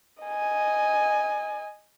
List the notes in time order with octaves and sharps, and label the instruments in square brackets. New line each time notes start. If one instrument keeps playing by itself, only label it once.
[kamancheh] D#5 G#5